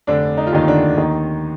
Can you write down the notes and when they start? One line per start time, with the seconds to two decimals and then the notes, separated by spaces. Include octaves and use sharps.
0.07 F1 D3 D4
0.37 D#4
0.47 F4
0.53 D#2 D#3 D#4
0.67 D3 D4
0.97 D#2 D#3 D#4